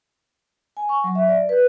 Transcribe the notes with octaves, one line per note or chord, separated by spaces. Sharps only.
G#5
C#6
F#3
E5
D5
B4